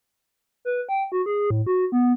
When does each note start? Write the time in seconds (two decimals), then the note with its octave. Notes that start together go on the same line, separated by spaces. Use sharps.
0.65 B4
0.89 G5
1.12 F#4
1.26 G#4
1.50 A2
1.66 F#4
1.92 B3